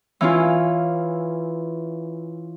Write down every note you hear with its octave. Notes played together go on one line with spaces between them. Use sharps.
E3 C#4 F4